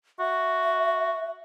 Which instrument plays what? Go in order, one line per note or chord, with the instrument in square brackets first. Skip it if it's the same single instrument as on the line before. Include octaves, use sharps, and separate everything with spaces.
[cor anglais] F#4 [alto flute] E5